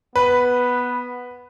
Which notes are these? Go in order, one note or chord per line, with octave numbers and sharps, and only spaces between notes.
B3 B4